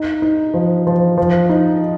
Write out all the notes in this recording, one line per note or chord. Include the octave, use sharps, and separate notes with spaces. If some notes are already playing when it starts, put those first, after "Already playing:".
Already playing: D#4
D#4
F3
F3
F3
D#4